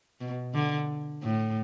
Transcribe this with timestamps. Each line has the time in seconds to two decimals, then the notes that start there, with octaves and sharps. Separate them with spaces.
0.21 B2
0.54 D3
1.23 A2